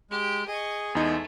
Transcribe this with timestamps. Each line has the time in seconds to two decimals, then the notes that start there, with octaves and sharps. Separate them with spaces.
0.10 G#3 G4
0.47 G#4 D#5 C#6
0.95 E2 G#3 A3 D#4